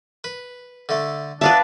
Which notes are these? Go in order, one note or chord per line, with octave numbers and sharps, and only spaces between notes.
B4
D3 A3
B3 D4 B4 E5 F5 A5